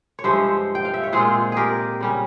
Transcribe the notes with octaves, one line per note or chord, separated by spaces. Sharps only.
C#5
G2 F3 G#3 C5 E5
G5
F5
E5
C#5
A#2 G#3 C4 F4 G#4 C5
G4 G#4 A#4
C#3 G3 C#4